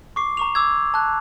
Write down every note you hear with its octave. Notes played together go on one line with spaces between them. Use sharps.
C#6 D6 C7
A#5 C#6 F7
D6 E6 G#6
A5 F#6